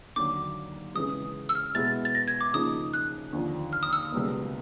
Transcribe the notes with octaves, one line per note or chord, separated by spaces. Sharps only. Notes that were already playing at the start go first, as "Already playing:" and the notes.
D#2 D3 F#3 D6
C#3 E3 G#3 D#6
E6
F6
B2 G#3 B3 E4 A6
A6
A#6
G#6
D6
C#3 F3 A#3 D#4 D#6
F#6
D#2 D3 F3
F6
D#6
E6
D#6
C#2 B2 G3 A#3